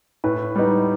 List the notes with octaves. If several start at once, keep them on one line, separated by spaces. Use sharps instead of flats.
A2 B4
G3 B3 D#4